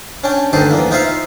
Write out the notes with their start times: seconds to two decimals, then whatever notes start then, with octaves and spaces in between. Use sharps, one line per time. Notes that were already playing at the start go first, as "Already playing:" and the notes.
0.24 C#4 D4 G5
0.53 D2 G2 D#3 G4 A4 C5
0.71 E2 A#3
0.91 D#4 F4 C5 E5 F5